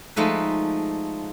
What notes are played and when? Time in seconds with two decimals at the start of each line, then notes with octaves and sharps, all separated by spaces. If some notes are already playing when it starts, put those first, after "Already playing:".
0.16 F3 G#3 A3 D#4 B4